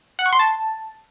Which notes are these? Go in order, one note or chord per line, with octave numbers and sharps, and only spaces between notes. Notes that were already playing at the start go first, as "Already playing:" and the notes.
F#5
C#6
C6
A5